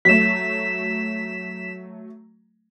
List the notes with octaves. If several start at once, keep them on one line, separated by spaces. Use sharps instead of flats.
F#3 A3 B6 E7